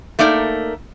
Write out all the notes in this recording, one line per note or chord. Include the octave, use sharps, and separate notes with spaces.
A3 A#3 D#4 A#4 D5